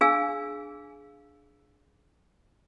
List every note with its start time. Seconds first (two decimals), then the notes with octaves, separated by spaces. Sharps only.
0.01 D4 G#4 F5 G#5 E6